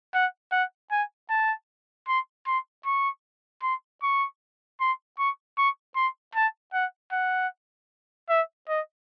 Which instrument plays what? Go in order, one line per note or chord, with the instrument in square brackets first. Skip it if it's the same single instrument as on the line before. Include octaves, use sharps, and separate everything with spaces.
[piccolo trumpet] F#5
F#5
G#5
A5
C6
C6
C#6
C6
C#6
C6
C#6
C#6
C6
A5
F#5
F#5
E5
D#5